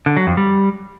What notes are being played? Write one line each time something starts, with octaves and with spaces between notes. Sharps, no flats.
D3
F#3
F2
G3